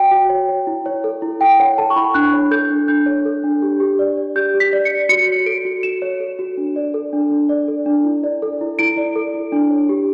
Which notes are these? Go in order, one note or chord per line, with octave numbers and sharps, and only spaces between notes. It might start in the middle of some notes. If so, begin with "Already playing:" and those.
Already playing: F#4 C#5 G5
F#4
C#5
C#5
E4
C#5
A4
E4
E4 G5
C#5 F#5
A4 A5
C#6
E4 B5
D4 F#6
C#5
A4 G6
D4
D4 G6
C#5
A4
D4
G4
G4
D5
D5
G4 G6
G4
B6
D5
C#7
D5
F#4 C#7
C#5
A4 D7
F#4
F#4 E7
C#5
A4
F#4
D4
D5
A4
D4
D4
D5
A4
D4
E4
D5
A4
E4
E4 D7
D5
A4
E4
D4
C#5
G4